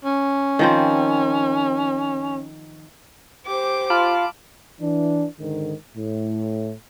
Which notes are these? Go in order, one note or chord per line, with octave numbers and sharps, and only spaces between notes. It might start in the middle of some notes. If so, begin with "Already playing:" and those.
C#4
D#3 F3 C4
G4 C5 D6
F4 A5 B5 F6
E3 D4
G#2 D3 D#3
A2